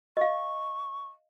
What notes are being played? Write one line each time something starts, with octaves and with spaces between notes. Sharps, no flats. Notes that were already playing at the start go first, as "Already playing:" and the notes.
D#5 F5 C#6